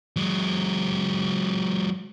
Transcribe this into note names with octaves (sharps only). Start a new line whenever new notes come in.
F#3 G#3